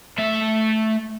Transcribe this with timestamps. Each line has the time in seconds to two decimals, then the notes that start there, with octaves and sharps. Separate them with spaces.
0.18 A3 E5